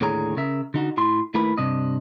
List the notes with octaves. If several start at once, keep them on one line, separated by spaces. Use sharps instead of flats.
D#2 A2 D3 G#4 C#5 A#5
C#3 A#4 E5
D3 D#4 F#4
A2 E4 C6
D#2 A3 E4 A#4 B4 B5
G2 C3 D4 D#5